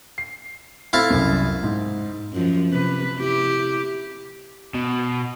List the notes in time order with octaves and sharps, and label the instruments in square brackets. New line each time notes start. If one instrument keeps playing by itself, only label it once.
[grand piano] C7
[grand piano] A3 C4 A6 [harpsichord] E4 F5
[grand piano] C2 F#2
G#2
[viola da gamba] F#2 F3
C3 B4
E4 G4
[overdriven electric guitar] B2